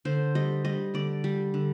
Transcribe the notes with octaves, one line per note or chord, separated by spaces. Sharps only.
D3 C5
G3 D#5
G3 D#5
D3 D5
G3
D3